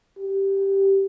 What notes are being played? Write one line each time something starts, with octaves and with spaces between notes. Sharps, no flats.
G4